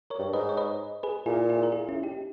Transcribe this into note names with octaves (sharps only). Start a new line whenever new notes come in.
A#4 C#5
G2
G#2 B4 D#5
C#5
B4 D#5
G#4 B4
A#2 E4 G#4
E4 G#4
A#4
E4 G#4
C#4 E4
D#4 G4